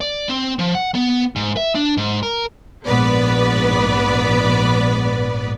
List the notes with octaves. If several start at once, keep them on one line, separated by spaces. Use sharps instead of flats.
D5
C4
F3
F#5
B3
G#2
E5
D4
G#2
A#4
A#1 G#2 B3 B4 D5